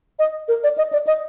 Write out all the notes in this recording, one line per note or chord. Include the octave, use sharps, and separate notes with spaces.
D#5
A#4
D5
D#5
D5
D#5